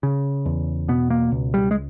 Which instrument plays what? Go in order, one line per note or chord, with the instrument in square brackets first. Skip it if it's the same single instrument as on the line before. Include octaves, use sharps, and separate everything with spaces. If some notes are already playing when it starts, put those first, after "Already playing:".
[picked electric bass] C#3
E2
B2 B3
A#3
C#2
G3
G#3